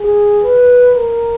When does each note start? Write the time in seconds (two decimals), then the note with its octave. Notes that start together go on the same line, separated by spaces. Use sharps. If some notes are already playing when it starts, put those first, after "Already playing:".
Already playing: G#4
0.43 B4
0.95 A#4